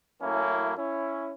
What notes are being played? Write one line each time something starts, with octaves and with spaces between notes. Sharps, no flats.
F#2 A2 A#3 C#4 E4
C#4 E4